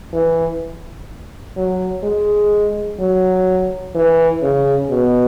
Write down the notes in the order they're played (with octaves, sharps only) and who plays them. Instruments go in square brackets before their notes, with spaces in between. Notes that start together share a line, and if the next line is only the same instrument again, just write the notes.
[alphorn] E3
F#3
G#3
F#3
E3
C#3
B2